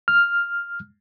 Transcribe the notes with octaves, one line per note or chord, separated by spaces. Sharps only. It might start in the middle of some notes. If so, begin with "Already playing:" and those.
F6